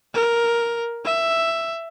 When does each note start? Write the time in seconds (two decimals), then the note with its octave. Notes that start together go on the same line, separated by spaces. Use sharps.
0.14 A#4
1.05 E5